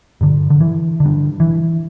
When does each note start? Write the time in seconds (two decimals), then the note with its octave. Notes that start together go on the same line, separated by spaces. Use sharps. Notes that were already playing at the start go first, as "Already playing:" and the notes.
0.21 G2 D3
0.50 D3
0.60 E3
1.00 G2 D3
1.40 E3